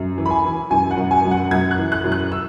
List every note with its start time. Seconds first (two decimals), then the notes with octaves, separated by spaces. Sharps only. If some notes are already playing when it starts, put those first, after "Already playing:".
Already playing: F#2
0.18 E3
0.26 B5
0.30 G#5
0.45 E3
0.70 F#2 G#5
0.91 F#5
0.97 F#2
1.11 G#5
1.25 F#2
1.31 F#5
1.51 F#2 G#6
1.71 F#6
1.78 E3
1.92 F#6
2.04 F#2
2.12 F#6
2.32 E6